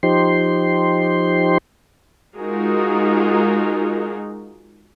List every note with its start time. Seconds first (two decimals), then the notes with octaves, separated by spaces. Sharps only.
0.03 F3 D#4 G4 C5 C6
2.38 G#3 D#4 F4 F#4 G#4 A#4